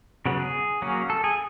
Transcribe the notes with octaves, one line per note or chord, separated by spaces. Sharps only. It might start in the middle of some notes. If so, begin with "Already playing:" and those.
C#3 F#3 B3
G#4
F#3 A#3 C#4
A4
G#4